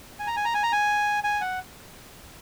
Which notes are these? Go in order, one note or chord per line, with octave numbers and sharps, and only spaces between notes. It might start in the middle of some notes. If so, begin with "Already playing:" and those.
G#5
A#5
G#5
A#5
G#5
A#5
G#5
G#5
F#5